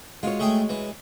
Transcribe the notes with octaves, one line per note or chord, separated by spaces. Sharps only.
G#3 F4 F#4 C#5
A3 G#4 G5
E3